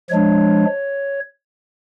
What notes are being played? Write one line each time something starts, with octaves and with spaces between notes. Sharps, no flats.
F3 G#3 D4 C#5